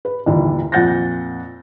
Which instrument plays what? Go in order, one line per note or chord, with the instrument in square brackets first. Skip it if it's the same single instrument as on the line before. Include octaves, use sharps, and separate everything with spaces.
[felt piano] B4
G1 D#2 A#2 E3
F2 A#2 F#5 G6 A6 A#6